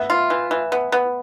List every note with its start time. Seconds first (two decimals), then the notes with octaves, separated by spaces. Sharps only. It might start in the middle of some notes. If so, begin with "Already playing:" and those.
Already playing: B3 E5
0.10 F4
0.30 E3
0.51 E3
0.72 B3
0.92 B3